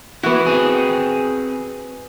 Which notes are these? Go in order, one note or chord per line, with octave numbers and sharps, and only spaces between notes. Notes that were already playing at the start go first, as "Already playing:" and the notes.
E3 B3 E4 F#4
C4 G#4